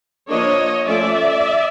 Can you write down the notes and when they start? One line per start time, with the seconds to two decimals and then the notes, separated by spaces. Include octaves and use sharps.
0.29 F3 A#3 D4 C#5 D#5
0.86 F3 A3 C#4 D5 E5